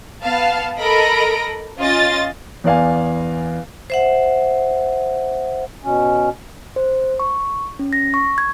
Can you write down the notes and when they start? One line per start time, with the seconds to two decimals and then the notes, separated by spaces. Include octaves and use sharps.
0.24 B3 F5 A5
0.79 A4 A#4 D#5 B5 A#6 D7
1.78 C#4 F4 D#5 A6
2.64 E2 B3 D5 F5 G#5
3.90 C5 E5 F#5
5.83 B2 C#4
6.76 C5
7.20 C#6
7.79 C#4
7.93 A#6
8.14 C#6
8.38 G#6